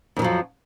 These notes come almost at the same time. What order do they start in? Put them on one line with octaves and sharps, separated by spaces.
F2 D#3 F#3 F3